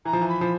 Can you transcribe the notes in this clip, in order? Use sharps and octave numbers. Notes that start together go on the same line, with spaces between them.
E3 A#5
F3
E3
B5
F3